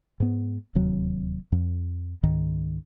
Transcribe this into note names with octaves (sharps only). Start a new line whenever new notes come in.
G#2 B3
D1 D#2 C3 F#3
F2
C#2 G#2 D#3